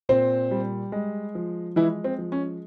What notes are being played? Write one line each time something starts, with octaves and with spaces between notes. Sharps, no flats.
A#2 C4 C5
G3
G#3
F3
E3 G#3 E4
C4
F3
C#4